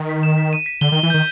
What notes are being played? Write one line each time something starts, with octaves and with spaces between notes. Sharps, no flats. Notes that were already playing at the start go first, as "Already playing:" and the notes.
Already playing: D#3
B6
E7
B6
D#7
B6
D3 G7
D#3
G7
E3
D#3 G6